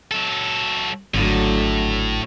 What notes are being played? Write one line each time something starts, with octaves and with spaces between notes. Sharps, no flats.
F#3 A4
G#1 A2 D3 F#3 A3